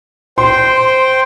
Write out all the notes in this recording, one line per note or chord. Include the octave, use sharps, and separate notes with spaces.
C5 G5 C6